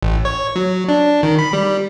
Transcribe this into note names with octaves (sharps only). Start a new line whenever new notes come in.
A1
C#5
F#3
D4
D#3
B5
G3